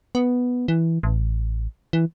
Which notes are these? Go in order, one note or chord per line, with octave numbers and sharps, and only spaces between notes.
B3
E3
A1
E3